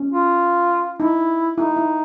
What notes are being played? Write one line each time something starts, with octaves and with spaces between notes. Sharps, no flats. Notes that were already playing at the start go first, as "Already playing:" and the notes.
Already playing: C#4
F4
D#4 E4
D#4 E4
E4